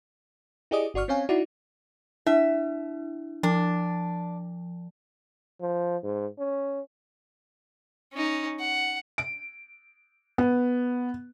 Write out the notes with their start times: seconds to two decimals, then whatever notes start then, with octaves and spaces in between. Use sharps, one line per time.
0.71 E4 G4 G#4 D5 D#5 D#6
0.94 G1 F#4 D5 C#6 F6
1.08 C4 C#4 C#5 F5 G#5
1.29 D#4 E4 F#4 D5
2.26 D4 E4 E5
3.43 F3 D4
5.61 F3
6.03 G#2
6.38 C#4
8.13 C#4 D#4
8.59 F#5
9.18 D7
10.38 B3